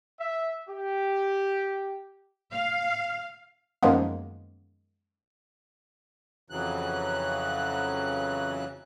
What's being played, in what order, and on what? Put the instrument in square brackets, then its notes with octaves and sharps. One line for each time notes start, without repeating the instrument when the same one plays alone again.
[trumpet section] E5
G4
[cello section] F5
[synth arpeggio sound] F#2 D#3 F3 G#3 A#3 B3
[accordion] F2 C#3 E3 F#3 F#6